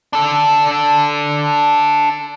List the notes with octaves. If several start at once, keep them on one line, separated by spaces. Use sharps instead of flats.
D4 A4